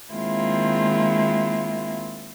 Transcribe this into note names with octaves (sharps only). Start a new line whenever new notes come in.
D#3 G#3 A#3 C4 E4 F4